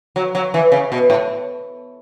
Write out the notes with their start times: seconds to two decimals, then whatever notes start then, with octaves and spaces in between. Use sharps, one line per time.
0.16 F#3
0.35 F#3
0.54 E3
0.72 C#3
0.92 B2
1.10 A2